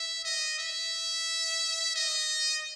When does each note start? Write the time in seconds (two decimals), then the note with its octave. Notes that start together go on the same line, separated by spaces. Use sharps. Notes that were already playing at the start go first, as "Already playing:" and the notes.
Already playing: E5
0.25 D#5
0.59 E5
1.96 D#5